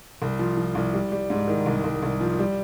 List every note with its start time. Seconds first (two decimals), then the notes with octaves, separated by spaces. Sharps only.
0.22 C2
0.39 F3
0.57 F3
0.75 C2
0.94 G3
1.12 G3
1.30 G#2
1.48 D#3
1.66 C2
1.84 C2
2.03 C2
2.21 F3
2.39 G3